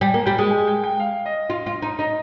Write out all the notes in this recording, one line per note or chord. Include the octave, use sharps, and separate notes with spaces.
G3 G#5
A#3
G3 G5
G#3
G#5
G5
G5
F5
D#5
F4
F4
D#4
D#4 D#5